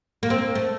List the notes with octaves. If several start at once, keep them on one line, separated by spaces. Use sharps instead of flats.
A#3
C4
A#3
A3